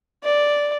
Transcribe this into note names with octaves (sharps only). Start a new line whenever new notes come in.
D5